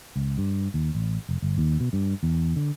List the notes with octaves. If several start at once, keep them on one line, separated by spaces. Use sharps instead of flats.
C#2
G2
D#2
A1
F1
G1
D#2
B2
G2
E2
D3